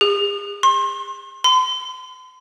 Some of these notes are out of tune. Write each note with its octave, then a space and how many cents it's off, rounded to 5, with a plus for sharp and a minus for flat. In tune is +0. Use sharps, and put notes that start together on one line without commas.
G#4 -45
C6 +35
C6 -45